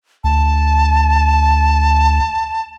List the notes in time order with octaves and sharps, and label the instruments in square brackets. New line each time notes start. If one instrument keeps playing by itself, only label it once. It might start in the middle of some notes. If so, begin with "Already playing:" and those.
[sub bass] D2 [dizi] A5